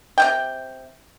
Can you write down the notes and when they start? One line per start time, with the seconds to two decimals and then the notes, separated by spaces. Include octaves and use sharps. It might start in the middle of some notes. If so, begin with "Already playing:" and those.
0.18 C3 C#4 G5